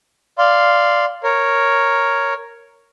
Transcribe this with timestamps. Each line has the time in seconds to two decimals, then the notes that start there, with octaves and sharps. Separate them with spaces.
0.38 D5 F5 C6
1.23 A#4 C#5